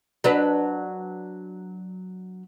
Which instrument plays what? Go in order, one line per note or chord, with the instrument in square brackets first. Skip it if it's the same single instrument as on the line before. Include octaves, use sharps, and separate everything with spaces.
[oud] F#3 D4 B4